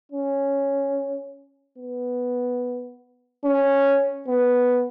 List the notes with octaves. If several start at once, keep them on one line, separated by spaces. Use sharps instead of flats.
C#4
B3
C#4
B3